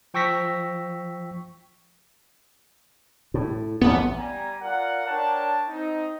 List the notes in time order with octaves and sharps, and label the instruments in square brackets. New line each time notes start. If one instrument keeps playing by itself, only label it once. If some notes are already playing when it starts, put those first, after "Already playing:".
[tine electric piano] F3 G5 C#6 E6 A#6 B6
[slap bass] A2
[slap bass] A1 D2 G2 [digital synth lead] B3
[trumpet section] G3 G#5 A#5
F4 A#4 D5 F#5
D4 A#4 C#5 G5 A5
C4 D#4